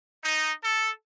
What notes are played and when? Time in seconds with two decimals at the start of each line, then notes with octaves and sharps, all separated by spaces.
0.24 D#4
0.62 A4